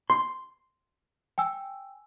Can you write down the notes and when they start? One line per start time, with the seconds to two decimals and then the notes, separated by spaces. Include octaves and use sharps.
0.10 C6
1.38 G5 G#5 E6